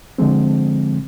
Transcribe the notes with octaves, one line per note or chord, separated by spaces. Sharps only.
D3 F3 G#3 C4